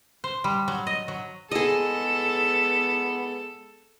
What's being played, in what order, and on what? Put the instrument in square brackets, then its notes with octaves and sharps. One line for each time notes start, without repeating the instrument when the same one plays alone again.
[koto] C5
G3
F#3
D#5
F#3
[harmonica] G#3 B3 [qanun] G#4 D#5 [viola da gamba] A4